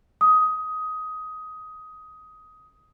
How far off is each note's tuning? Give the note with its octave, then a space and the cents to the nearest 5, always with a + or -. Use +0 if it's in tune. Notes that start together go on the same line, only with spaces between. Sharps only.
D#6 +15